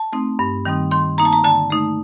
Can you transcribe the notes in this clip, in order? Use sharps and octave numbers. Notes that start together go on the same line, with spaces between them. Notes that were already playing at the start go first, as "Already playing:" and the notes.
Already playing: A5
A3 C4 D#4
G2
D#3 G3 C4 D#4
D#3 C6
A#3 D#4 A#5
A5
A#5
D3 A5
A3 D#4